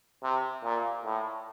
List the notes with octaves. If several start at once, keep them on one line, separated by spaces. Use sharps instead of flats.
C3
A#2
A2